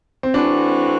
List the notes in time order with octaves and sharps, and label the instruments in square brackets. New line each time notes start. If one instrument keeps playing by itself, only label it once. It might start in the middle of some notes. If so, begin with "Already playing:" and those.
[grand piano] C4
[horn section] E3 A3 C4 F#4 [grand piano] D4